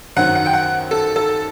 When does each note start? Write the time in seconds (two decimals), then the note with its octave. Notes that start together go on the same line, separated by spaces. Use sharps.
0.16 F#2 D#3 F#3 C4 F#5
0.35 F#5
0.46 G5
0.53 F#5
0.91 A4
1.16 A4